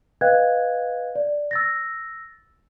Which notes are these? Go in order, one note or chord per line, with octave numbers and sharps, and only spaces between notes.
B4 D#5 F5 G5 F#6 G#6
D5
E6 A6 A#6